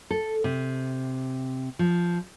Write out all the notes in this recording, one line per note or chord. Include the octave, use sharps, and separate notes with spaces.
A4
C3
F3